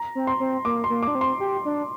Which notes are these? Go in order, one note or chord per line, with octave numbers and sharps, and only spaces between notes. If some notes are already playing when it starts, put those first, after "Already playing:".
Already playing: A#5
C4
C6
C4
A#3 D6
C6
A#3
D6
D4
C4
C6
G4
D4